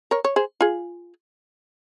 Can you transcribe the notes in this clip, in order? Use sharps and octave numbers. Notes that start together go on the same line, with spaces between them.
A#4 C#5
C#5
G#4 C5
F4 G#4